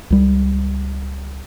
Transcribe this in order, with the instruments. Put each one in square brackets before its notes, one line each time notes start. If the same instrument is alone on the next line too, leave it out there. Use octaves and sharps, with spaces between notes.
[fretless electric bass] C#2 G3